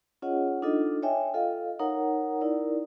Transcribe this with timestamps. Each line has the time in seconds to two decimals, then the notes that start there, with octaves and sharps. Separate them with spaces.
0.22 C#4 F4 G#4 C#5 D#5 F#5
0.62 D4 D#4 F4 A4 D#5
1.03 C#5 D#5 E5 G5 G#5
1.34 F4 A4 D#5 F5
1.79 D#4 A#4 C#5 F#5 A#5
2.41 D#4 E4 A#4 D5